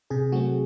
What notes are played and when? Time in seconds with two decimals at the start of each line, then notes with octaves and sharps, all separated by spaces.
0.10 C3 G#4
0.32 F#3 A3 C4 F#4